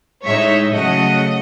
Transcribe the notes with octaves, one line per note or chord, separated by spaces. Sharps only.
A2 G#3 D#4 C#5 E5
C#3 F#3 A3 D#5 F#5